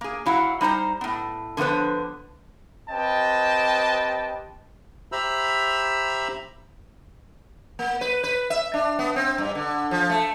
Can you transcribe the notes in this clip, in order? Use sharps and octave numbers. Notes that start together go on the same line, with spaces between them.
A#3 G#4
F#3 E4 F5 F#5
G3 D#4 C5 A#5
A2 B3
D3 F3 A3 B3 B4 C5
C4 G4 B4 D#5 G5 A5
G4 C5 E5 A#5 B5 E6
A#3
B4
B4
E5
D4
B3
C4
G2
D3
F3
A3